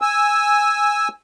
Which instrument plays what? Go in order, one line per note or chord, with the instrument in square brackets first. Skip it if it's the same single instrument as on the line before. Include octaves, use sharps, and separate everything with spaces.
[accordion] G#5 E6